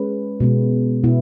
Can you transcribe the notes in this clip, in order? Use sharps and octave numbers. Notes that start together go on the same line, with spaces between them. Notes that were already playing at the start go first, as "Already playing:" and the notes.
Already playing: G#3 C#4 G#4 B4
B2 G#3 B3
B2 B3 E4